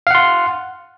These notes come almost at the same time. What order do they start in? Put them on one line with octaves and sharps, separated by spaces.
F5 F#5 C6